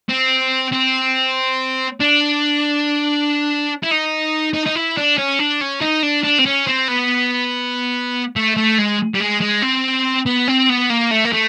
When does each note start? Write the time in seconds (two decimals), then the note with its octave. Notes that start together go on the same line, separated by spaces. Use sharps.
0.09 C4
0.73 C4
2.01 D4
3.83 E4
3.91 D#4
4.54 D#4
4.66 D#4
4.76 E4
4.97 D4
5.18 C#4
5.39 D4
5.61 C#4
5.81 D#4
6.03 D4
6.24 D4
6.39 C4
6.46 C#4
6.67 C4
6.88 B3
8.36 A3
8.57 A3
8.79 G#3
9.15 G3
9.21 G#3
9.42 G#3
9.62 C4
10.26 B3
10.48 C4
10.69 B3
10.90 A#3
11.11 A3
11.25 A#3
11.32 A3